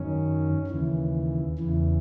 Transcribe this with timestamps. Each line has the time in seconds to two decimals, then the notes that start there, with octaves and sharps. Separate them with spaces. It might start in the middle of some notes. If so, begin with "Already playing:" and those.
Already playing: F#2 D#3 C#4
0.67 D#2 C#3 E3
1.59 E2 C#3 E3